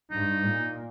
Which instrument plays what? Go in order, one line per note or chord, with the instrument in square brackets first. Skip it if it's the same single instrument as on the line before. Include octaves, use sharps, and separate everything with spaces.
[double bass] G2 [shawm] D#4
[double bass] A#2